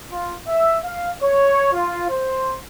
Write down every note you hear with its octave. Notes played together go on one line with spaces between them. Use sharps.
F4
E5
F5
C#5
F4
C5